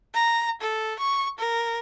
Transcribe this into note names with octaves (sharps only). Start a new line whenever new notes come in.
A#5
A4
C#6
A#4